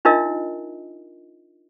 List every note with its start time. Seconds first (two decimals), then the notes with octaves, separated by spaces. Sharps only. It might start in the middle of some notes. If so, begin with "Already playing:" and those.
0.05 D4 D#4 F4 A#4 D#5 E5